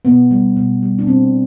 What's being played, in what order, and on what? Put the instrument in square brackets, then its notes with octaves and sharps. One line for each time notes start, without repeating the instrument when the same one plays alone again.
[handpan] B2 B3
G3
B2
G3
D4
B2 C4